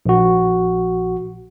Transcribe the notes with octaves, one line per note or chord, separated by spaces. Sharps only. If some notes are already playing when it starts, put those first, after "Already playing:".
A#1 F#4